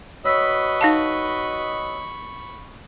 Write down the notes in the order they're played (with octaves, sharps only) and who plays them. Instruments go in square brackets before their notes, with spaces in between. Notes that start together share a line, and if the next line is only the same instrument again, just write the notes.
[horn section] F#4 B4 D#5 [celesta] C#5 E6 B6 [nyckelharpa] B5 C#6
[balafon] D#4 F5 A5